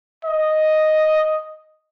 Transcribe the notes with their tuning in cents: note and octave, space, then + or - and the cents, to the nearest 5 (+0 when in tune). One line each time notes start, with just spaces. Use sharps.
D#5 +0